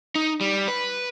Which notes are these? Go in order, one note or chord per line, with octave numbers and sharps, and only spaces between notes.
D#4
G3
B4